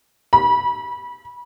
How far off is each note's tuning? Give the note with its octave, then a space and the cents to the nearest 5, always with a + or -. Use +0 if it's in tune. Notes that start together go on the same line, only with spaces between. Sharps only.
B5 -30